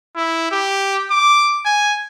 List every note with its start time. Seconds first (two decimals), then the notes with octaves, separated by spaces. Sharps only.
0.16 E4
0.52 G4
1.11 D6
1.65 G#5